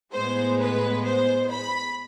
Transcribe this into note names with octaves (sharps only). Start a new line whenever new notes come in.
A2 G#3 B3 C5
B4
C5
B5